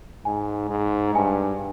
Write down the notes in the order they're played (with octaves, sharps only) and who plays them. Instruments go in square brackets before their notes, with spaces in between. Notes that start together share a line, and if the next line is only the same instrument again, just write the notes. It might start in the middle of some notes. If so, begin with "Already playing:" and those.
[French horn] G#2 [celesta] G#5
[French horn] G#2
[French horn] G2 [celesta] G#5